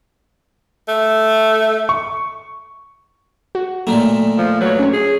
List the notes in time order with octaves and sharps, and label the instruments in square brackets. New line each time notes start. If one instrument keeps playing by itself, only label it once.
[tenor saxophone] A3
[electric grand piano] C#6
[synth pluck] F#4
[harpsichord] A#2 D#3 A3 [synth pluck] F#3 A#3
[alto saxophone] F3
[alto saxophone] F#3 [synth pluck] B4 C#5
[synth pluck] C#4 C5 C#5
[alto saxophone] G#4